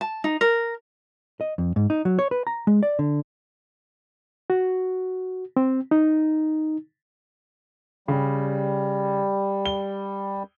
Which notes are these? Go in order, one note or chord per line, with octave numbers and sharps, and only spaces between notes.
A5
D#4
A#4
D#5
F2
G#2
D#4
F#3
C#5
B4
A#5
G#3
D5
D3
F#4
C4
D#4
C#3 G3
G7